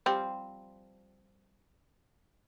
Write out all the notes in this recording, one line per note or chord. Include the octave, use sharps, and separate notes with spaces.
F3 G3 C4